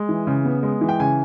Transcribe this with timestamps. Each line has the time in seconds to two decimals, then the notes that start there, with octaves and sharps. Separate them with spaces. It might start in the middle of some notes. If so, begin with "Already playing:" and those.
Already playing: G#3
0.09 E3
0.27 C#3
0.45 B3
0.63 G#3
0.81 E3
0.89 G5
1.00 C#3 G#5